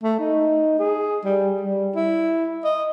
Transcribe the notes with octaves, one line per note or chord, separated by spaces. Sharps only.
A3
D#4
G#4
G3
G3
E4
D#5